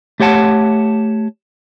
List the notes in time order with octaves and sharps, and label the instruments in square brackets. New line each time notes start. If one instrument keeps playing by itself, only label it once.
[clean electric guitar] A3 G4 C#5 F#5 A5